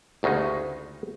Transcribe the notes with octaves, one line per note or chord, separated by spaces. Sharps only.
G1 D2 C#3 G#3 D#4